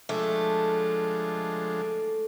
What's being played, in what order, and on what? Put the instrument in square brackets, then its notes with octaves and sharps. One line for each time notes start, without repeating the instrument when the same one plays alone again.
[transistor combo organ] F3 G#3 D4 [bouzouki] A3